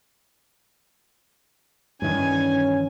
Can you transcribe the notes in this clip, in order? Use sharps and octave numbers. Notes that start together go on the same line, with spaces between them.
G2 D#3 E3 C#4 G#5